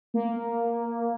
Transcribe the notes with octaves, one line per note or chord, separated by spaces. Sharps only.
A#3